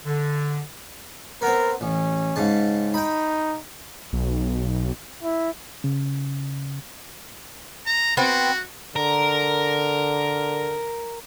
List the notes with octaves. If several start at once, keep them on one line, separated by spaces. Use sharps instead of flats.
D3
B3 C4 A#4
A1 C#4
G#2 C#3 A5
D#4 G5 B5
B1
E4
C#3
A#5
B3 C4 F#4
D3 A#4